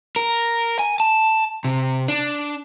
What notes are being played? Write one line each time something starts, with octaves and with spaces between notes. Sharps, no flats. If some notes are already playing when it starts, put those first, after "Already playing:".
A#4
G#5
A5
C3
D4